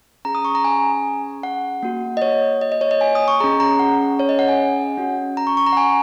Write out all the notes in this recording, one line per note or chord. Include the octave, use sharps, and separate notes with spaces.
C#4 G#4 A#5
D#6
C#6
A#5
G#5
F#5
A#3 F#4
D#5
C#5
D#5
D#5
C#5
D#5
G#5
D#6
C#6
C#4 G#4 A#5
A#5
F#5
C#5
D#5
F#5
G#5
C#4 F#4
A#5
C#6
C#6
A#5
F#5
G#5